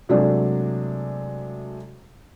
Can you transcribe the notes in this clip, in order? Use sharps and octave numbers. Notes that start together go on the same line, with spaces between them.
C3 F#3 G#3 A3 D4 D5